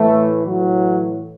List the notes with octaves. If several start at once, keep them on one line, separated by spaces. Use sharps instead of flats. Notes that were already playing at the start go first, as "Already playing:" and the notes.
Already playing: A2 E3 A3
A2 E3 F#3